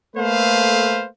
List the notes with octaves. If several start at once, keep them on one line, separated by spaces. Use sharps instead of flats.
A3 A#3 A4 B4 C5 F5